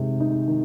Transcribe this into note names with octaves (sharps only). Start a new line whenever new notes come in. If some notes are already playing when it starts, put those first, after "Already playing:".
Already playing: C3 D#3 G#3
D#4
D#3